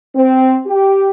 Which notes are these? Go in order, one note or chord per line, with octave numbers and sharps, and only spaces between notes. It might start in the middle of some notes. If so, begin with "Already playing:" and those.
C4
G4